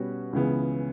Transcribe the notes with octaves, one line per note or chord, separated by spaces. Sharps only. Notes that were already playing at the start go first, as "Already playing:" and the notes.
Already playing: B2 G3 C#4 F#4 B4
C#2 C#3 E3 B3